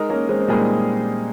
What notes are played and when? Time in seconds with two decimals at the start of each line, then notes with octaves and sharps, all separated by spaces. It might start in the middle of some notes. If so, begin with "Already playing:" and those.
Already playing: G#3 D#4 A#4
0.10 A#3 C#4
0.29 G#3 C4
0.40 C4
0.48 A#2 G3 G#3 A#3 D#4 G#4